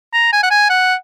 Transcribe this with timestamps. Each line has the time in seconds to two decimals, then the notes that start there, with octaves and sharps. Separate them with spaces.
0.14 A#5
0.33 G#5
0.43 F#5
0.51 G#5
0.70 F#5